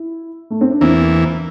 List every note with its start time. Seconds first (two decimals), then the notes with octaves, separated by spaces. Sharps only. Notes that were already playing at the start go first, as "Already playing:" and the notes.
Already playing: E4
0.50 A3
0.61 C4
0.71 D4
0.81 E2 E3 A#3 C4